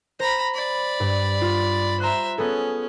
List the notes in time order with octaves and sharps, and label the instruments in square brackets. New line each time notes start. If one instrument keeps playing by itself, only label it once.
[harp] C5 [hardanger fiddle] A#5 B5
[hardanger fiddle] D5 B5
[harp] G2
F4
[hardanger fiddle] C5 E5 [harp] A#5 F#6
[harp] B3 G#4 A4 [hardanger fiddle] C#4